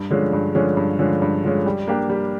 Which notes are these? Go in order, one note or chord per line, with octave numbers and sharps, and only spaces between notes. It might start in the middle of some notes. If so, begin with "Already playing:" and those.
Already playing: G2
D3 F3 G#3 C#4
G2
D3 F3 G#3 C#4
G2
D3 F3 G#3 C#4
G2
D3 F3 G#3 C#4
G3
A#3 D4 G4
G3